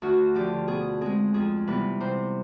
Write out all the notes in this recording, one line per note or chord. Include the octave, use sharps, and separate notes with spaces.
D2 F#4
D3 F3 G4
B2 G#4
G#3 C4 G#4
F2 G#4
C3 E3 G3 B3 B4
C3 C5